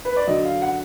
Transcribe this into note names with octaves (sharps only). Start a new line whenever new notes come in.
B4
D5
D3 F#3 D#5
F5
F#5